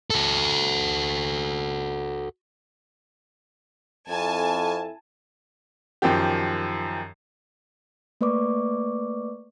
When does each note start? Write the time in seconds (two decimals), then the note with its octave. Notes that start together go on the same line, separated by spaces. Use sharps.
0.10 F#4 A4
4.09 F2 C4 E4 A4 G#5 A5
6.02 F#2 D#3 F3 G4
8.21 A3 A#3 B4 D5 C#6 D6